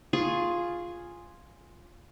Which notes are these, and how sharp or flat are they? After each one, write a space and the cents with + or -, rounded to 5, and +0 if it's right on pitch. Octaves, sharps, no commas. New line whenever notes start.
F4 +0 G#4 -5 C#6 -10